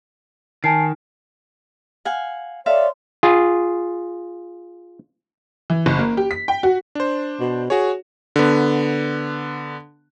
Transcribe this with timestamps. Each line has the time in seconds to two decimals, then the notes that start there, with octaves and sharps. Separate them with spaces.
0.64 D#3 G#5 A5 C7
2.05 F5 F#5 G#5
2.66 A4 C#5 D5 E5 F5 C6
3.23 F4 G#4
5.70 E3
5.86 F#1
5.99 A#3
6.17 G4
6.31 B6
6.48 G5
6.63 F#4
6.95 D4 C5
7.40 B2
7.70 F#4 G#4 C#5
8.36 D3 B3